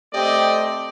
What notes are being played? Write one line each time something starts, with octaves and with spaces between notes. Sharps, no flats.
A3 C4 G4 D5 D#5